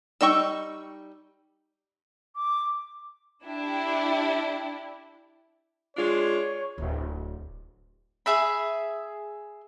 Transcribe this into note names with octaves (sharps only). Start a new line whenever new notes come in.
G3 D#4 G5 C#6 E6
D6
D4 E4 G4
G#3 D4 F4 C#5
D1
G#4 E5 B5